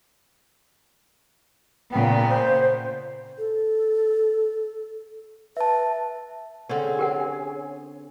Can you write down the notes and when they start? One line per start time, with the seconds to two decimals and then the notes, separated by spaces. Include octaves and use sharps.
1.92 A#2 C#3 B3 G5
2.29 C5
3.38 A4
5.57 B4 E5 A5
6.69 D3 C4 C#4 G#4 C#5 G#5
6.99 G4 A#4 F#5